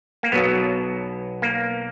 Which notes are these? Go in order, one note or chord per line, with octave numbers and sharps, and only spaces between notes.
A#3
B1 B2 F#3 B3
A#3